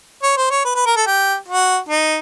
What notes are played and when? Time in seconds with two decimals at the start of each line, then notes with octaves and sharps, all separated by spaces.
0.23 C#5
0.37 C5
0.50 C#5
0.65 B4
0.75 B4
0.86 A#4
0.96 A4
1.06 G4
1.48 F#4
1.89 D#4